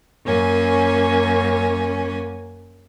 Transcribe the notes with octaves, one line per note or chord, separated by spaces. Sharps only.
F#2 A#3 C#4 G#5